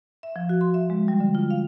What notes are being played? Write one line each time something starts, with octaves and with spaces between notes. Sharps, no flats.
E5
F3
F#4
C6
E5
G#3
G3
D3
F4
F5